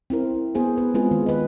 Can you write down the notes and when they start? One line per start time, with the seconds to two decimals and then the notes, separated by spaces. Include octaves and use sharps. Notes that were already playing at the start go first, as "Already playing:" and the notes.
0.10 C4 E4 A#4
0.55 B3 G#4 C5
0.77 B4
0.94 G#3 B3 C4 F4 G#4 B4
1.11 D#3
1.26 B4 D#5